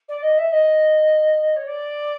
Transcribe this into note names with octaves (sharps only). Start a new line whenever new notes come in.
D5
D#5
E5
D#5
C#5
D5